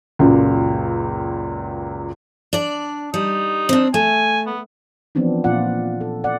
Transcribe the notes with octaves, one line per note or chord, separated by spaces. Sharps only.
C#2 F#2 A#2
D4 D5
G3 D#4
C4 D4
A3 G#5
B3
E3 F3 B3 C4 D4 D#4
A#2 F4 D5 F#5
A4
D5 F#5